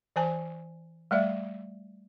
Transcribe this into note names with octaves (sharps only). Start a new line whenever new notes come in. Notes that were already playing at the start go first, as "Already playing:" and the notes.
E3 C5 G#5 A5
G3 A3 D5 E5